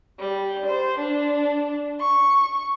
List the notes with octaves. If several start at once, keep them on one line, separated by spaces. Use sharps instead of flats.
G3
C5
D4
C#6